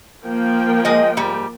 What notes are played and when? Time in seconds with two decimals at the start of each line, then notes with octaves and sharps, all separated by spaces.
0.24 F3 A#3 G5
0.85 G#3 D#5
1.17 G#2 G3